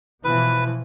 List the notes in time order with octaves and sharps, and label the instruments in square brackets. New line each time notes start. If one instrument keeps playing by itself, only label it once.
[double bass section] B2 E3 F3 [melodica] B4